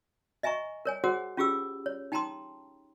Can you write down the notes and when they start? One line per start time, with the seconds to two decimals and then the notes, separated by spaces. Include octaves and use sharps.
0.43 D#5 E5 G#5 A#5 C#6
0.85 A#4 C#5 G#5
1.04 F#4 G#4 A#4 C5 F#5 D#6
1.37 C#4 F4 G4 G#4 D6 E6
1.86 C#5
2.12 D#4 G5 A5 A#5 C6 D#6